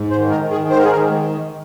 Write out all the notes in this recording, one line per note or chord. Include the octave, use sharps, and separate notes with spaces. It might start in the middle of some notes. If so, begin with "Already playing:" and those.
Already playing: G#2
C5
D#3
A#4
D#3
G#4
G#2 C5
A#4
G#4
A#4
D#3